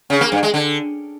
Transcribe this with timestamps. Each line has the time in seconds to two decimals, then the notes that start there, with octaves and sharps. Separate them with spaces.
0.10 C#3
0.21 A#3
0.32 G2
0.43 G#3
0.54 D3